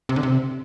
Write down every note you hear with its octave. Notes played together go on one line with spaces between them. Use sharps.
C3
D3
C3